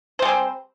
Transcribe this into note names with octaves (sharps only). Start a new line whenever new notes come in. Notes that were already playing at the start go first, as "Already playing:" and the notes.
G3 G#3 C4 C5